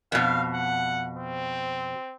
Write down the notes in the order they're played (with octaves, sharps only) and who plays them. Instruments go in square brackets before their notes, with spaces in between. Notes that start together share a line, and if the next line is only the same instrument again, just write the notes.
[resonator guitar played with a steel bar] F2 B2 [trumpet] F5
[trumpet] F#5
C4